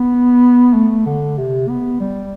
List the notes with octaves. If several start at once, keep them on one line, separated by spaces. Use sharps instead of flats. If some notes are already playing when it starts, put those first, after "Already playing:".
Already playing: B3
A3
D3
C3
B3
G3